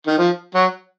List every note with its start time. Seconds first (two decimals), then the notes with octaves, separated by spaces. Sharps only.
0.07 D#3
0.18 F3
0.54 F#3